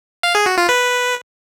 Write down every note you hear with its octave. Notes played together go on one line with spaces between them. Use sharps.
F5
G#4
F#4
F4
B4